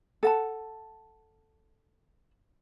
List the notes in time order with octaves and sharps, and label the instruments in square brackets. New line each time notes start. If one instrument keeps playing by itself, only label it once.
[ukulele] A4 F#5 A5